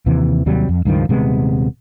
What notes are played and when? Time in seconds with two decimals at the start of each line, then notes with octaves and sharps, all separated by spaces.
0.06 D#2 C3 E3
0.46 D#2 C3 F#3 G3
0.69 F2
0.85 C#2 G2 D#3 F3
1.09 D#1 C3 G#3 B3